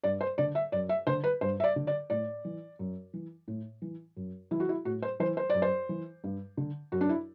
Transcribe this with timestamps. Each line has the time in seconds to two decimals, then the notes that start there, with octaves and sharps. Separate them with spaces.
0.03 G2 D5
0.21 C5
0.38 D3 D5
0.55 E5
0.72 F#2 D5
0.89 E5
1.07 D3 C5
1.24 B4
1.41 G2 C5
1.60 E5
1.64 D5
1.76 D3
1.87 D5
2.10 A2 D5
2.45 E3
2.79 F#2
3.13 E3
3.48 A2
3.82 E3
4.16 F#2
4.51 E3 E4
4.60 F#4
4.69 E4
4.85 A2 F#4
5.02 C5
5.20 E3 C5
5.37 C5
5.50 F#2 D5
5.62 C5
5.89 E3
6.24 G2
6.57 D3
6.92 F#2 F#4
7.01 D4
7.09 E4